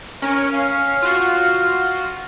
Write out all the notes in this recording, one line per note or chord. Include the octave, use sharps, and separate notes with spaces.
C#4 A#4
F5
F4 F#4